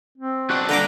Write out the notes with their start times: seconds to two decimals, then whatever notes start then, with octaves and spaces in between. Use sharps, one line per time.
0.18 C4
0.50 B1 D4 F#4
0.69 G2 A#2 D3 F#5 A#5 D6